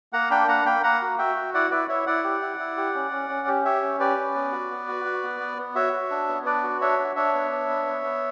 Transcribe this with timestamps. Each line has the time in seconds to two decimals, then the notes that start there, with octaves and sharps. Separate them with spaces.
0.13 A#3 F#5 A#5
0.31 D4 G5 B5
0.48 A#3 F#5 A#5
0.65 A#3 G5 B5
0.83 A#3 F#5 A#5
1.02 F#4
1.18 F#4 E5 G5
1.36 F#4
1.54 E4 D5 F#5
1.71 E4 B4 D5
1.88 E4 C#5 E5
2.07 E4 D5 F#5
2.24 G4
2.42 E4
2.59 E4
2.77 G4
2.94 C#4
3.11 C#4
3.29 C#4
3.48 G4
3.65 G4 C#5 E5
3.82 C#4
4.00 G4 B4 D5
4.17 C#4
4.35 B3
4.52 F#4
4.71 B3
4.88 F#4
5.05 F#4
5.23 B3
5.40 B3
5.58 B3
5.75 F#4 C#5 E5
5.93 F#4
6.10 D4
6.28 B3
6.45 D4 B4 D5
6.63 F#4
6.81 D4 C#5 E5
6.99 D4
7.16 D4 C#5 E5
7.34 B3
7.52 D4
7.69 B3
7.86 B3
8.04 B3